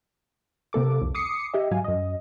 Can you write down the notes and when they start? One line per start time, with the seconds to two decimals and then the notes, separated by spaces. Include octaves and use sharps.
0.73 C3 A#3 A4 D6
1.02 C2 F2
1.15 D6 D#6 C7 C#7
1.54 G4 D#5 E5
1.71 G#2 F#3 F5 G#5
1.84 F#2 D#5